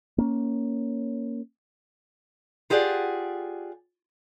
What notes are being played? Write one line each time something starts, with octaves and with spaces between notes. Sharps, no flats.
A#3 C#4
F4 G4 G#4 D5 F#5